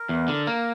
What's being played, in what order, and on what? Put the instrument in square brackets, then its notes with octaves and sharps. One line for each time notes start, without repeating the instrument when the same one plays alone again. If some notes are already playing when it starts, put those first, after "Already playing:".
Already playing: [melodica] A#4
[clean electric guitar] E2
D3
[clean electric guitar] A#3 [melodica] A#4